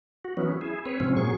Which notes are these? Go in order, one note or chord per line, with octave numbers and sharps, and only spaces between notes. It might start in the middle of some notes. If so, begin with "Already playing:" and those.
F#4
E3 F#3 B3 C#4
E4 G#4
C4 B4 C#5
G#2 C3 F3 C4 C#4
A#2 F#3 G#4 C#6